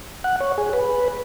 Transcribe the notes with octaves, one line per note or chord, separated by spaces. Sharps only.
F#5
C#5
G#4
B4